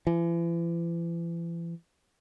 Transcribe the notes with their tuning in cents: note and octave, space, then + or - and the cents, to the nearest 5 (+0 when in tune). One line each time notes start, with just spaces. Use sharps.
E3 +40